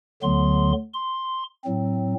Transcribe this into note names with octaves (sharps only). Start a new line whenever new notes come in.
D2 D3 F#3 B3 C6
C6
A2 F#3 C4